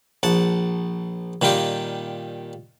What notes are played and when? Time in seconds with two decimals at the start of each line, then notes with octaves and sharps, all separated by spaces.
0.23 A#1 F#5 A5
1.42 A#2 D#3 G3 F4 G4